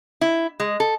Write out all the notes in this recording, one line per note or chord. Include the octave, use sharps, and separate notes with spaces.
E4
G#3
A4